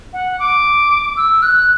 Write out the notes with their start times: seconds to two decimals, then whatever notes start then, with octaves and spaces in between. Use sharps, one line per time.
0.13 F#5
0.39 D6
1.17 E6
1.42 F#6